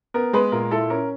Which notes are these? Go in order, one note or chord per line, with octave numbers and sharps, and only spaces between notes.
B3 A#4
G#3 B4
A#2 A#4
E4 A4
C#4 A#4